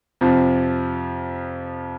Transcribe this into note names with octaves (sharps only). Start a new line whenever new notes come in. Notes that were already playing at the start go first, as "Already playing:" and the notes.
F2 C3 F3